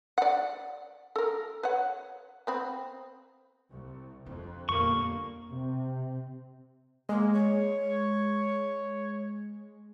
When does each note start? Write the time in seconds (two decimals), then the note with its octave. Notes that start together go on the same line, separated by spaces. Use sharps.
0.18 D5 F#5
1.16 A4 A#4
1.63 B4 C#5 F#5
2.47 B3 C4 B5
3.71 C2
4.26 F2 D3
4.69 G1 F2 A#2 A#3 C#6
5.51 C3
7.09 G#3 A#3
7.33 C#5